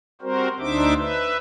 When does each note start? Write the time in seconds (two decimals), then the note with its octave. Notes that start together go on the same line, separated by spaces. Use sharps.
0.22 G3 C4 F#4 A#4 C5
0.59 D2 D4 D#4 C5 E5 D6
0.97 B4 E5